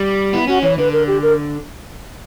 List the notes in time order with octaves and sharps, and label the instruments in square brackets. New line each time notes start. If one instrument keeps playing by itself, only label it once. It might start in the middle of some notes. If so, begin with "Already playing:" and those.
Already playing: [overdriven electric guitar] G3
[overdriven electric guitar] B3 [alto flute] E4
[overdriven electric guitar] C#4 [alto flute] F#4
[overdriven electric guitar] E3 [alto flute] C#5
[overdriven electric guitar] D3 [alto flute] B4
[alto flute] A#4
G4
A#4